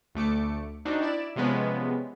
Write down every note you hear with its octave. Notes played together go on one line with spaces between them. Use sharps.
D2 A3 D6 C#7
C4 D4 D#4 F#4
E4 D5 E7
C3 F3 G#3 B3 C#4